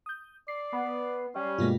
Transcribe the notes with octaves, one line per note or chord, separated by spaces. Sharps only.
D#6 G6
D5 C7
B3
G3 C#4
G2 B2 G#3 A#3 B3 F4